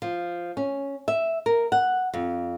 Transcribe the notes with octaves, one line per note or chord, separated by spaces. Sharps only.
F3
C#4
E5
A#4
F#5
F2